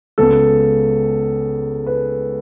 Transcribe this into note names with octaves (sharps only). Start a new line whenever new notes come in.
C#2 C#3 G#3 B3 A4
B4